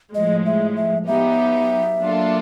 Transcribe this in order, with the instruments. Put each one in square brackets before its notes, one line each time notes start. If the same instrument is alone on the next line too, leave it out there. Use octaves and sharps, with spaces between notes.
[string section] A2 F3 G#3 [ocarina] D#5
[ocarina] E5
E5
[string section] F#3 B3 D#4 G4 [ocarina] E5
[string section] F#3 A#3 D4 F4 A4